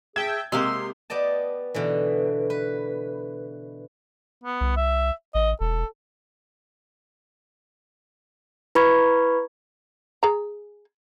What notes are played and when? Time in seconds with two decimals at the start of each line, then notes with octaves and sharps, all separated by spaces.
0.16 G#4 E5 G5 A5 G#6
0.52 C3 G#3 A#3 G4 C6 E6
1.10 B3 G4 D5 D#5 A5
1.74 B2 D3 E3
2.50 B4
4.43 B3
4.61 C2
4.77 E5
5.35 A1 D#5
5.61 E1 A4
8.75 E4 B4 B5 C#6 G#6
10.23 G#4 A#5